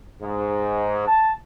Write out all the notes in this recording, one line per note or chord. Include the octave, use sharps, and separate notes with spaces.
G#2
A5